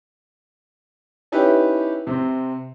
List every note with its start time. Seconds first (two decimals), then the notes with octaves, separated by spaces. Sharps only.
1.32 C#4 D#4 E4 G4 B4
2.07 C3 C4